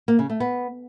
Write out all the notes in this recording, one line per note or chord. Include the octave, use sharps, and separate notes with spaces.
A#3
C#3
A3
B3